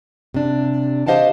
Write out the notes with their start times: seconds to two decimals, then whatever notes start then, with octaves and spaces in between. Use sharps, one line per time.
0.34 C3 D4
1.07 G4 C5 D#5 F5 F#5 A5